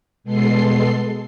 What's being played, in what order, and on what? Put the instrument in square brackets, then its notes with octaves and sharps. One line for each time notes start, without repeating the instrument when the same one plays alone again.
[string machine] B2 G#3 B3 A4 C6 C7